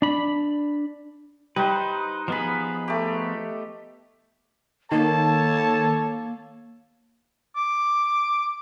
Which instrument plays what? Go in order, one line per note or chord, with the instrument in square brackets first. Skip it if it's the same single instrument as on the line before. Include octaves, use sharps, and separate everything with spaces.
[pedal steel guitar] D4 B5
[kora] G3 [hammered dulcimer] D#4 [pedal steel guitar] B4 C5
[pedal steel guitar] F3 B3 G#4 [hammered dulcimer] D#4 B5
[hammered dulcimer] A3 G4
[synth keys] D#3 [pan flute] A#3 [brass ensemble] A4 C#5 [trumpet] A5
[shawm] D6